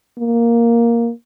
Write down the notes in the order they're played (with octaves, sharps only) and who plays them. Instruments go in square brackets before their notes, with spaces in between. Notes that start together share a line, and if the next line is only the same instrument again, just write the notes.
[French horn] A#3